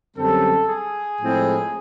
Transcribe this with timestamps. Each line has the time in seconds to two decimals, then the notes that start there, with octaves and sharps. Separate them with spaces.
0.16 F#2 D3 G3 C4 A4
0.68 G#4
1.19 A2 F3 G#3 C4 E4